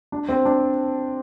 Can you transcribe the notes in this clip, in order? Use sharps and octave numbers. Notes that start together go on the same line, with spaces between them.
D4
C4
D4